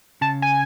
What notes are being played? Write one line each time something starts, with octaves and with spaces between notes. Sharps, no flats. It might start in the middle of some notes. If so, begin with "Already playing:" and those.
C#3 A5
G#5